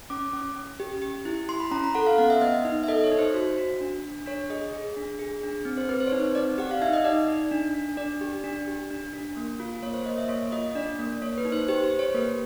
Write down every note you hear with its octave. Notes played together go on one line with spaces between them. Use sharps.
C#4 D6
C#4
C#4
G4
G4
E4
E4 C6
B5
C#4 A#5
B5
A4 F#5
F5
B3 F#5
E5
B3 D#5
D#4
E5
A4 D#5
C#5
D#4
C5
F#4 C5
F#4
D4
D4
D4 C#5
G#4 D#5
G#4
D4
G#4
D4
C4
C5
C4 B4
C5
C#5
D#4 C5
C4 D5
G4 F#5
F5
D#4 E5
D#5
D#4 D5
D#4
D4
D4
D4 D5
G4
D4
G4
D4
D4
A#3
F4
A#3 C#5
C5
A#3 D#5
E5
A#3 C#5
F4 D#5
D4 D5
A#3
A#3 C#5
B4
D#4
C5
G4 C5
C5
G4
C#5
A#3 B4